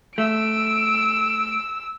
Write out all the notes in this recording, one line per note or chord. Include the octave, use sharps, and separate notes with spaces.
A3 E6 D7